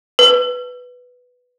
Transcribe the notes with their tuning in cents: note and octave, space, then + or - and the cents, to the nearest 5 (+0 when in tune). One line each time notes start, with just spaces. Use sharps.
B4 +5